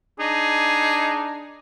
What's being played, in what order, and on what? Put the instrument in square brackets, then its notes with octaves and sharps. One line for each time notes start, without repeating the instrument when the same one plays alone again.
[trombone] D4 [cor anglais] D#4 [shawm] G#4